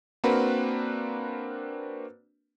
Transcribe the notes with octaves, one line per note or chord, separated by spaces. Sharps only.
A#3 C4 D4 F#4 A#4 B4